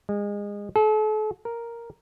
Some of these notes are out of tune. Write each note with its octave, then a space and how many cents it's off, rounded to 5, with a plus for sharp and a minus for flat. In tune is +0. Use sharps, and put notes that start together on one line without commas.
G#3 -25
A4 -40
A#4 +0